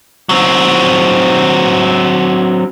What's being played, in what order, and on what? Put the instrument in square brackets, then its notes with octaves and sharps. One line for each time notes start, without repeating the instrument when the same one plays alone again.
[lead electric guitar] F#3 C4